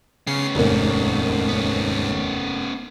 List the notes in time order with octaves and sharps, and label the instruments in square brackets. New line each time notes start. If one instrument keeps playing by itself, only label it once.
[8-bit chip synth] C#3 C7 [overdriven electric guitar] B3 C#4
[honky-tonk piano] F1 A#3 [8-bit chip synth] D#2 G#2
[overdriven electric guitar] B3 C#4